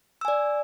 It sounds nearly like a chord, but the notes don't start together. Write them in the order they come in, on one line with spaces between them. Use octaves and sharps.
E6 G#5 D5